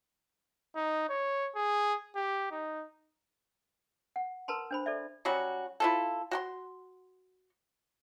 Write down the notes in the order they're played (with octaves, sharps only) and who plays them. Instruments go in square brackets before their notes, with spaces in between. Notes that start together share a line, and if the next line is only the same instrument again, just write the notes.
[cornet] D#4
C#5
G#4
G4
D#4
[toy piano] F#5
A#4 B4 A5 A#5 C6
D4 C5 B5
A4 D5 E5
[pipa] F#3 G3 C#4 F#4
E4 F4 A4
F#4 G5 C6